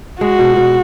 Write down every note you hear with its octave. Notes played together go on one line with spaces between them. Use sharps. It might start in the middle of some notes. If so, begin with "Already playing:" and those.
G#3 F#4
B2
B2